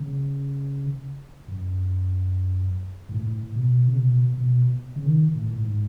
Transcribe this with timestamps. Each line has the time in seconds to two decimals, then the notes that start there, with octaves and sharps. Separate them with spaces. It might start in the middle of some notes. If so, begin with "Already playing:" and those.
Already playing: C#3
1.48 F#2
3.09 G#2
3.14 A2
3.55 B2
3.87 C#3
3.96 B2
4.37 B2
4.96 C#3
5.06 D#3
5.34 A2
5.52 A2
5.62 G#2